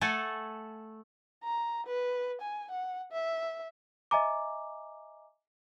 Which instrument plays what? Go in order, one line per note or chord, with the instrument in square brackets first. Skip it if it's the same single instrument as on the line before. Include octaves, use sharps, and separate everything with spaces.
[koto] A3 A4 F#5 G#5
[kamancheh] A#5
B4
G#5
F#5
E5
[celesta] D#5 E5 G#5 A#5 D6